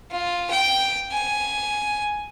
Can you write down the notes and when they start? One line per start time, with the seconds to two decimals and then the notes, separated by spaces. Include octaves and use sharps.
0.11 F4
0.51 G5
1.12 G#5